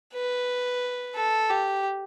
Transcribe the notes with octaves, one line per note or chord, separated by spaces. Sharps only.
B4
A4
G4